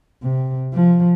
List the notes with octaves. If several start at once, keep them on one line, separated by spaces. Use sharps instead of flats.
C3
F3